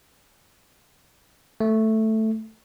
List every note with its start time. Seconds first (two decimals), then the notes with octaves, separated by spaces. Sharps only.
1.60 A3